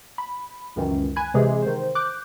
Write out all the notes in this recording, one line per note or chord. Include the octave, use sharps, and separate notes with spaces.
B5
C#2 F#2 D#3 E3
G#5 B5 F#6 G#6
C3 E3 G#3 G4 G#4
D#3 C5
D6 F#6 G6